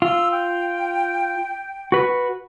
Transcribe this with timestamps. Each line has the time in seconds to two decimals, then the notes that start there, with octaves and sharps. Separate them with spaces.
0.02 F4 E6
0.31 G5
1.92 F#4 B4